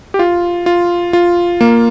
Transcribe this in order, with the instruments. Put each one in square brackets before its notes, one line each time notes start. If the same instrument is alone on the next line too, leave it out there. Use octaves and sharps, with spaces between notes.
[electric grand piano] G4
F4
F4
F4
A#3